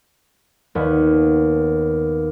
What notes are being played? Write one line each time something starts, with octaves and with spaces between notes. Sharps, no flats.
D#2 B3